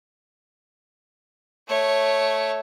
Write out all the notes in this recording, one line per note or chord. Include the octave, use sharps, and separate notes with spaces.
A3 C#5